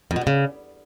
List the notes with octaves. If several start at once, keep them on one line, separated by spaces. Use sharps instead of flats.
F2
B2
G2
C#3